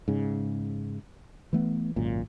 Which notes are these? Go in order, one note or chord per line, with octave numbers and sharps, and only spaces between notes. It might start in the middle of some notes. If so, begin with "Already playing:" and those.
G#2 C#3
E3 A3 B3
G#1 F#2 A#2